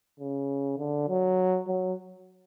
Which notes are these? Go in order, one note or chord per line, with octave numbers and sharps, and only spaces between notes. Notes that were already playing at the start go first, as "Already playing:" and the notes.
C#3
D3
F#3
F#3